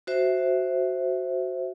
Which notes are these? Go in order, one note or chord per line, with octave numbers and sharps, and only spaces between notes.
F#4 C5 E5